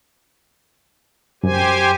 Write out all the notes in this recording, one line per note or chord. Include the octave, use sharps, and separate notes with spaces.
F#2 G4 C5 G#5